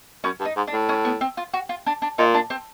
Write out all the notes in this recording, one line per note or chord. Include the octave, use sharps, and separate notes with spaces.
F#2 C#4
G2
D#4
G#2
D4
A2
C#4
B3
C4
F4
F#4
F4
D4
D4
A#2 D#4
D4
C4